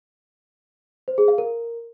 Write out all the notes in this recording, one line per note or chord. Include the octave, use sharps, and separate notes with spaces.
C5
G#4
F5
A#4